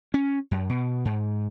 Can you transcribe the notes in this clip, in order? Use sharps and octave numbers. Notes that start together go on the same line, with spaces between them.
C#4
F#2
B2
G#2